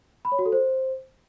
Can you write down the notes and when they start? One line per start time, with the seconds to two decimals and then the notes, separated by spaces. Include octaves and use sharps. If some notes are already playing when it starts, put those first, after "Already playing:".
0.25 B5
0.32 C#5
0.39 F#4
0.45 A4
0.52 C5